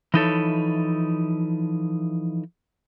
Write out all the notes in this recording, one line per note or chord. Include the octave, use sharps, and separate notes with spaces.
E3 F3 D#4 E4 A4 C#5